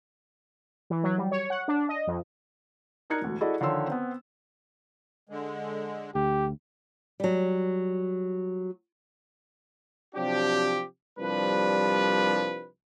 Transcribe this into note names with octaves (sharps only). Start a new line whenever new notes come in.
E3
F#3
G3
C#5
F#5
D4
D#5
F2
D4 D#4 A#4 F#6 G#6 C#7
E1 D2
E4 F#4 G#4 A4 D5 D#5
D3 D#3 F3 C#5 C6 E6
B3 C4
D3 G#3
D2 G4
F#3 G3
C3 F3 F#3 D4 G4
C2 F3 G3 D4 B4